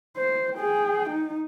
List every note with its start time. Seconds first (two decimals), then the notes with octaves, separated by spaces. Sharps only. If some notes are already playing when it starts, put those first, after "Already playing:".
0.17 C5
0.55 G#4 G5
1.10 D#4